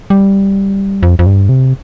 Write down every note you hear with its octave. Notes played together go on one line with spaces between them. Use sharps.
G3
F2
F2
G2
C3